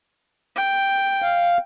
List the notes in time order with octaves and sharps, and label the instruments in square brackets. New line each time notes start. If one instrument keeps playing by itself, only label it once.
[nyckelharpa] G5
[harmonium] F5